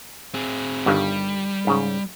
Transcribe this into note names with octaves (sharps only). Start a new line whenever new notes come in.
C4 G#4
G1 G2 D#3 G3
G#2 C#3